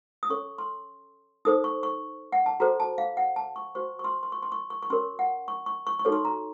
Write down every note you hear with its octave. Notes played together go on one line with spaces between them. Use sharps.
D#6
C#4 A4 C#5 C#6
C6
D#4 A4 C5 D#6
C#6
C#6
F#5
A5
F#4 A4 C5 A#5
A5
F5
F#5
A5
C#6
F#4 C5 C#6
C#6
C6
C6
C#6
C6
C#6
C#6
C#6
C#4 F#4 A#4 C#5 C6
F#5
C#6
C#6
C#6
C#6
D#4 F#4 A4 C#5
C6
A#5